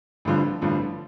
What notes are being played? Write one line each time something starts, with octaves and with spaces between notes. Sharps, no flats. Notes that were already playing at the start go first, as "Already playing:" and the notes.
A1 G2 D3 F3
A1 G2 D3 F3